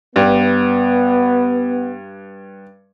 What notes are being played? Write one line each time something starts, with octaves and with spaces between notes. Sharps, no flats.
G2 B3